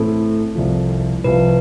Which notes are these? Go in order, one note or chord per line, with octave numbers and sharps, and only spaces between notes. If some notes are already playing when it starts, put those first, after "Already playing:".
Already playing: A2 E3 A3 C4 E4 A4
C2 C3 F3
C2 C3 F3 B4